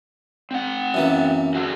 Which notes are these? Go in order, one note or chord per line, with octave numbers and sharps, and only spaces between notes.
C4 F#5
F#2 E3 A#3
F#4 G#4 A4